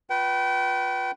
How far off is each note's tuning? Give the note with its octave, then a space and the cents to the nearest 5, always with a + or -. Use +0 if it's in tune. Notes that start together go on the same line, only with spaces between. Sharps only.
F4 +20 B4 -5 G5 -30